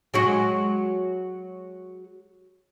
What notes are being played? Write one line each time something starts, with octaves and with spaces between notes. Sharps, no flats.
F#3 G#3 F#4